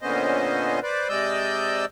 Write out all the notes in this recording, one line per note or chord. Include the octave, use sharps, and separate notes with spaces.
A#2 D3 B3 C#4 C5 D#5
B4 C5 D5
C3 G#3 D5 D#5 E6 G6